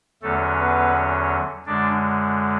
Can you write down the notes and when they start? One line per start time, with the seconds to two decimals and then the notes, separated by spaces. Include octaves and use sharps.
0.22 E2 D3 F#3 A3 C#4 A4
0.58 B3 B4
1.66 F#2 D3 G#3 D4 D5